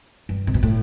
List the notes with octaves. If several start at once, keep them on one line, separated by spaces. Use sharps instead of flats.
G2
C3
B2
A2